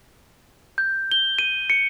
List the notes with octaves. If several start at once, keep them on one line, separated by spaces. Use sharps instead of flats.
G6
G7
D#7
C#7